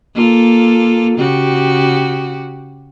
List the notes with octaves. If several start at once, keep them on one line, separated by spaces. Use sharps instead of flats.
A#3 F4 A4
C#3 F#4 G4